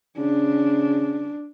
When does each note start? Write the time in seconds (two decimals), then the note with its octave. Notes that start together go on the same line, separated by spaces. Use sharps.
0.18 C#3 D4